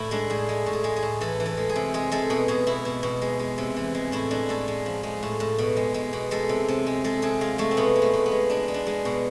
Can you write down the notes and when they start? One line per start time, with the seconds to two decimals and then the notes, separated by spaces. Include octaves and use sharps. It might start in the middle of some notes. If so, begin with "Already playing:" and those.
Already playing: A2 E4
0.11 G#3 D4
0.30 A2 G#4
0.49 G#3
0.66 A2
0.73 G#4
0.84 G#3
0.96 G#4
1.03 A2
1.21 E3 A4
1.40 E3
1.46 A4
1.57 G#3
1.69 G#4
1.76 C3
1.94 G#3 G#4
2.12 G#3 A4
2.30 B2 G#4
2.48 B2 G#4
2.67 B2 E4
2.85 B2
3.03 B2
3.22 G#3
3.39 G#3
3.58 C3
3.76 E3
3.95 G#3
4.12 A2 E4
4.31 G#3 D4
4.49 A2 A4
4.68 G#3
4.86 F3
5.03 G#3
5.23 A2
5.40 A2
5.58 B2
5.77 G#3
5.94 G#3
6.13 B2
6.31 G#3 A4
6.49 C3
6.68 C3
6.87 G#3
7.04 G#3 A4
7.22 C3 G#4
7.41 G#3 F4
7.58 G#3 A3
7.71 C4
7.77 B2 B3
7.96 G#3
8.02 A3
8.14 B2
8.26 B3
8.32 G#3
8.50 G#3 D4
8.68 G#3
8.74 D4
8.87 G#3
9.05 B2